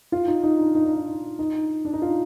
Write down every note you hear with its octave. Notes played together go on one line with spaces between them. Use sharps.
F4
D#4
D#4
D4
D#4
D4
D#4
D#4
D4
D#4
F4